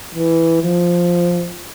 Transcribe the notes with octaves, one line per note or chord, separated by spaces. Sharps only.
E3
F3